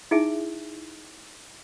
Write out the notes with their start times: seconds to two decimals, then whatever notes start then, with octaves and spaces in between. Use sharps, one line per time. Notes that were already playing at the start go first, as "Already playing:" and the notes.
0.11 D#4 E4 G#4 E5 G#5